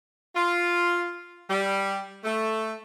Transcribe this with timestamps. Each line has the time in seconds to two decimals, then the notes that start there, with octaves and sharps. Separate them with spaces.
0.36 F4
1.50 G3
2.24 A3